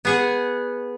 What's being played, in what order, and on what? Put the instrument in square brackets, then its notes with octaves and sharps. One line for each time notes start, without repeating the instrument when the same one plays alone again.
[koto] B3 G#4 F#5